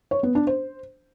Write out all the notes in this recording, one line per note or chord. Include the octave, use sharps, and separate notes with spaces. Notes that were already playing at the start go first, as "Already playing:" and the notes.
C#5
B3
D4
C5